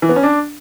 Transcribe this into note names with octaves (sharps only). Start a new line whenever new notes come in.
E3
B3
C#4
D4